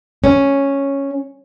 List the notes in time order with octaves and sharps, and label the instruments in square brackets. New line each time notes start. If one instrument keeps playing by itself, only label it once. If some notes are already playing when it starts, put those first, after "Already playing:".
[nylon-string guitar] C#4